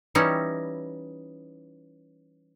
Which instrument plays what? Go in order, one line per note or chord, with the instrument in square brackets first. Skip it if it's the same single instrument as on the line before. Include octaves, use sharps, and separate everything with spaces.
[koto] E3 G3 C#4 D#4 E4